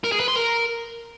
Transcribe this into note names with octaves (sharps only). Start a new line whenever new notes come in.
A#4
G#4
B4
C6
A#4